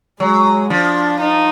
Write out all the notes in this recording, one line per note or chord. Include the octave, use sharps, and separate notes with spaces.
F#3 G#3
F3 D4
D#4